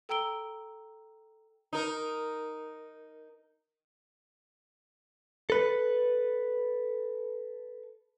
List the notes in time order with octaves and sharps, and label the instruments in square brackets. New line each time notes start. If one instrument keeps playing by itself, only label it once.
[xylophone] A4 G5 A#5 E6 D7 G7
[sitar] D#4 A#4
[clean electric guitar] A4 B4